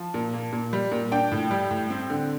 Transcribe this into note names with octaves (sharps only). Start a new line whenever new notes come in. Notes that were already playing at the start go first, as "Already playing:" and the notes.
Already playing: F3 A5
A#2
A#3
A#2
G3
A#2
D4 G5
A2
G3
A2
C4
D3